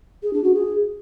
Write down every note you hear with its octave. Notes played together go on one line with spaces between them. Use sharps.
G#4
D4
F#4
G#4